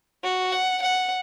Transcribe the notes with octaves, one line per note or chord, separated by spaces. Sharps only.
F#4
F#5
F#5